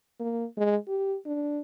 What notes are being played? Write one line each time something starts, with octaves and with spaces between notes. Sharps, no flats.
A#3
G#3
G4
D4